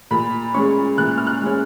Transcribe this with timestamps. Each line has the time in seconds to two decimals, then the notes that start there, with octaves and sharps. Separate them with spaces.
0.11 A#2 B5
0.54 G#3 C#4 C#6
0.98 A#2 F#6
1.18 F6
1.27 F#6
1.42 G#3 C#4